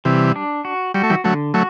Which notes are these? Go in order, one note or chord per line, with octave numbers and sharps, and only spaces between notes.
C3 E3 G3
D4
F#4
G3 F#4
A3
E3 G3
D3 F#3 A3
F#3 A3 F#4